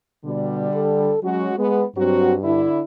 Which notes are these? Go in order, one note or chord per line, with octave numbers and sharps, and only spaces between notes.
B2 D3 G3
A4
F#3 G#3 C#4 F#4
G#3 B3
G2 F#3 C4 F#4
D3 D4 E4